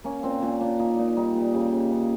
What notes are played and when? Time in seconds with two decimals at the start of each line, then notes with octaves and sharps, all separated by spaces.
0.04 A#3 C#4
0.23 A#2 C4
0.42 A#2 C#4
0.61 A#2 D4
0.79 A#2 D#4
0.98 A#2 D#4
1.17 G3 D#4
1.36 A#2
1.54 C#3 G4
1.72 C#3
1.91 C#3